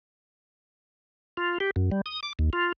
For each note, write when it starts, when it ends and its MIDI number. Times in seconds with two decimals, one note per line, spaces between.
1.37 1.58 65
1.60 1.71 67
1.76 1.90 42
1.91 2.01 55
2.06 2.20 87
2.23 2.33 86
2.39 2.50 39
2.53 2.72 65